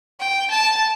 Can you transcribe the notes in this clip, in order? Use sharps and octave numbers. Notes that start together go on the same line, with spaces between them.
G5
A5